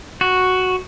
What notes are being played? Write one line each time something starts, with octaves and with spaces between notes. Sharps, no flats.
F#4